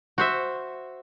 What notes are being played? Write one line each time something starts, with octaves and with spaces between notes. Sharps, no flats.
F#4 C5 E5